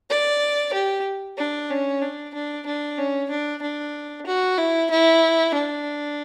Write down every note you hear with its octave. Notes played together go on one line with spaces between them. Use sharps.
D5
G4
D4
C#4
D4
D4
D4
C#4
D4
D4
F#4
E4
E4
D4